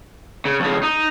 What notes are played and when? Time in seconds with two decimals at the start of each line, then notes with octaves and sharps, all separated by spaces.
0.45 C#3
0.60 F2 C#3
0.83 D#4